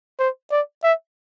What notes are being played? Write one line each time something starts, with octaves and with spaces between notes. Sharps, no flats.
C5
D5
E5